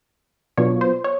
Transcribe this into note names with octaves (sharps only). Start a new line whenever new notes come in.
B2 F#3 B3 D4 F4 C#5
C5
C#5